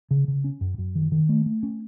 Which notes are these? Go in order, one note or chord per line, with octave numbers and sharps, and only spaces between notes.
C#3
C#3
C#4
F#2
F#2
D#3
D#3
A3
A3
C#4